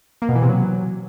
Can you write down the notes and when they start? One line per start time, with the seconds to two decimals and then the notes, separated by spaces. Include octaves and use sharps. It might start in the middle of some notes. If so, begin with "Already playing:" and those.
0.22 A#3
0.29 B2
0.35 E3
0.42 C3
0.49 F#3